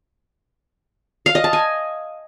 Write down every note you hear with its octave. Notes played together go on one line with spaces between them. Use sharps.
F5
D#5
A5
G#5